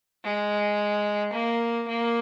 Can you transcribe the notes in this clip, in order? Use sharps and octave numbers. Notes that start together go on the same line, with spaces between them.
G#3
A#3
A#3